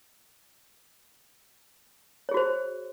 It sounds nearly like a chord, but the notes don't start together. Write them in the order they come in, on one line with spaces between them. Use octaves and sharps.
C#5 G#4 F#4 C5